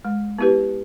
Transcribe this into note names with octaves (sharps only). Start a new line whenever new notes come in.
G#3
B3 E4 G4 B4